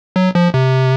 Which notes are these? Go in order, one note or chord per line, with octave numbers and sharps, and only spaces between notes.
F#3
F3
C3